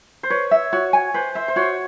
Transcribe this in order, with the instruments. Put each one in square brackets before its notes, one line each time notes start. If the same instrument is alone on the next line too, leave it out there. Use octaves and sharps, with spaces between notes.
[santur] C5
[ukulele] B4 [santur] C#5
[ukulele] E5
[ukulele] F#4 [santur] C#5
[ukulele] G#5
[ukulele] B4 [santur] C5
[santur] C5 [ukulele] E5
[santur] C5
[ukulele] F#4 [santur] C#5